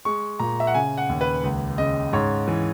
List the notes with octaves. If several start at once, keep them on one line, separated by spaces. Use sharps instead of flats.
G#3 C#6
A#2 A#5
E5
F#5
C#3 G#5
F#5
D#2
B4
C#2
C#3 D#5
G#2 C#5
E3